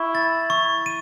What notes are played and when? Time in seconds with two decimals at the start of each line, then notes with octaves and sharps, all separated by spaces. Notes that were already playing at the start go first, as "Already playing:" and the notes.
Already playing: E4 C#6
0.15 A6
0.50 C#6
0.86 D#7